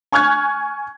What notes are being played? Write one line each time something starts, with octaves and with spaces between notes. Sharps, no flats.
G#5 C#6 F6 F#6 G#6